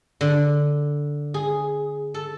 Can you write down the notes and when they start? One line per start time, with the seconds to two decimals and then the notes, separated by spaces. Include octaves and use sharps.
0.21 D3
1.34 G#4
2.14 A4